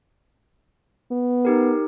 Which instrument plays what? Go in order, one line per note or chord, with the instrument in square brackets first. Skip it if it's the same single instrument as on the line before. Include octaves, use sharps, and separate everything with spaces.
[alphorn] B3
[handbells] D#4 G4 A#4